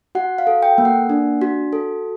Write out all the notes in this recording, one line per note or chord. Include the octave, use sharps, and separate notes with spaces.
F#4 F#5
F5
A4
G5
A#3
F#5
D4
F#4
A4